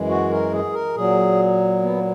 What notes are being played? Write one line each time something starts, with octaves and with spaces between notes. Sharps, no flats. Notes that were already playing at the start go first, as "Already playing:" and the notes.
Already playing: F#2 E3 G#3
F#4
A#4
G#4
A#4
A#2 F#3 G#4
B3
A#3